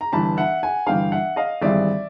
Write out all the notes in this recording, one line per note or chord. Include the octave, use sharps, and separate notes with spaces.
A#5
G1 G2 E3 A5 B5
E5 F#5
F#5 G#5
G1 G2 E3 F5 G5
E5 F#5
D#5 F5
G#1 G2 E3 G3 D5 E5